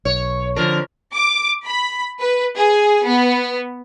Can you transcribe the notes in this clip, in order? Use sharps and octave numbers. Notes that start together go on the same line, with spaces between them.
B1 C#5
D3 F3 D4 A#4
D6
B5
B4
G#4
B3